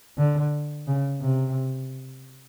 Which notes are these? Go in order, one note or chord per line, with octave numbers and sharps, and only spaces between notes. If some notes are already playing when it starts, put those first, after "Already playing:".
D3
C#3
C3